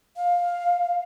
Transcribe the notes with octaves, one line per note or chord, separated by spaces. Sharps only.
F5